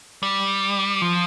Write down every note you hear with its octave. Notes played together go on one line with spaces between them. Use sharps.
G3
F3